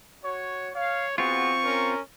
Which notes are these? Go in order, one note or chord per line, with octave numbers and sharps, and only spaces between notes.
F#4 C#5
C#5 F5
B3 C4 F4 F#4 G#4 C#6
C#4 A#4